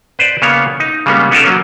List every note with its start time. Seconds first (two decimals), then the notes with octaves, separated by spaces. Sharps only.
0.19 B4 C5 D5
0.42 C#3 A#3 B3 C#5
0.80 D#4
1.06 C#3 G3 G#3 A#3 B3 C#4
1.31 B3 C#4 D#4 F4 A4 A#4
1.45 F#3 A#3 C#4